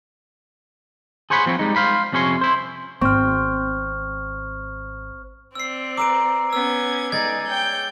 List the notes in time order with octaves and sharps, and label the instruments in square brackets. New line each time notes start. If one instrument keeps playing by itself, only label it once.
[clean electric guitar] G#4 C5 C#5 F#5 B5
F3 C4 C#5
G3 G#3 D#4
C5 F5 B5
F2 C3 C#4 C#5 C6
E4 C5
[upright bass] G#1 [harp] C4 [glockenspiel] C#6 F6
[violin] C4 D5 [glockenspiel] E6 C7
[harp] B4 A#5 [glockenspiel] D6 E6 D7
[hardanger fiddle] B3 C#4 [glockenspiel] E6 [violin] G#6
[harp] G#3 [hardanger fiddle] D#4 [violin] G#4 D5 [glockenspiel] G#6 A6
[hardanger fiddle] C#5 G5 [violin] G6